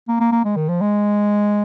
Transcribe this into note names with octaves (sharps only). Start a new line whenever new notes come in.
A#3
A#3
A#3
G#3
D#3
F3
G#3